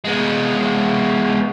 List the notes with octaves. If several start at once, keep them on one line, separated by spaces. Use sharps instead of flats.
G#3 B3